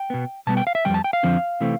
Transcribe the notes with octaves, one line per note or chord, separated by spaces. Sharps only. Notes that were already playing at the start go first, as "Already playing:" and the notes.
Already playing: G5
B2 B3
B2 G3 B3 A5
G5
F5
E5
F2 C3 G3 G5
A5
G5
F5
F2 D3 F3 C4
C3 E3 A3 C4